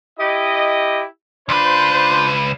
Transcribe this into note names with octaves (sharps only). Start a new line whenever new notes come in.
E4 G4 D#5
C#2 D4 F4 B4 C5